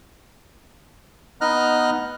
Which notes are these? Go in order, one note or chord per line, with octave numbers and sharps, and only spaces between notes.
B3 D#4 D#5 A#5 F6 F#6